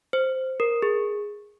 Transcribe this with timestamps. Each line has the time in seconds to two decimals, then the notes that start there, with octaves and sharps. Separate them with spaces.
0.13 C5
0.60 A#4
0.82 G#4